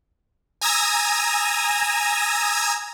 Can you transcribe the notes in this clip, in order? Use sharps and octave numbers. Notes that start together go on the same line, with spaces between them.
G#5 A#5 D#6 E6 G#6 A#6